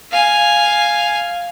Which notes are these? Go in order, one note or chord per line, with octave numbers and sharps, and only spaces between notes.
F5 G#5